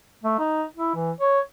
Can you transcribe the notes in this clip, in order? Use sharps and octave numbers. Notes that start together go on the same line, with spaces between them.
A3
D#4
E4
E3
C#5